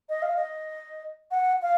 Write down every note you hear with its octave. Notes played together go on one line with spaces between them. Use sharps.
D#5
F5
D#5
F#5
F5